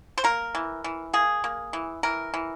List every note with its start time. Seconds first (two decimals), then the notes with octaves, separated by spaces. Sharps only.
0.18 C5
0.24 A#3 A#4
0.55 E3
0.84 E3
1.13 A#3 G#4
1.44 A#3
1.73 E3
2.03 E3 A#4
2.34 E3